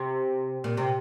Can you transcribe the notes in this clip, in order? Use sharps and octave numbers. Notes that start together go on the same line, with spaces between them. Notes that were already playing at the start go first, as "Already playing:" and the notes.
Already playing: C3
A#2
C3